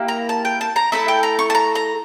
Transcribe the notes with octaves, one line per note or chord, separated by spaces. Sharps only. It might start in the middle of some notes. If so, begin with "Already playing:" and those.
Already playing: A#3 E4 G4
A#5
A5
G5
A5
A#5
A3 E4 A4 E5
G5
A#5
C#6
A5
A#5
A#5